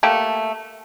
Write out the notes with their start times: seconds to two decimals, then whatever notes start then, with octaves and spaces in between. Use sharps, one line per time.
0.03 A3 A#3 G4 A4